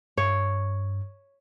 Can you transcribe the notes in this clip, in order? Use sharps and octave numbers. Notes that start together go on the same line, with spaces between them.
G2 C#5